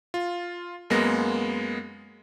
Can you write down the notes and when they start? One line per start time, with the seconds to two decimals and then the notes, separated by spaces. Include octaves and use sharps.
0.14 F4
0.90 F#2 G#3 A#3 B3 A#6